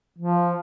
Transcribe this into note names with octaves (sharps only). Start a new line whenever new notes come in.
F3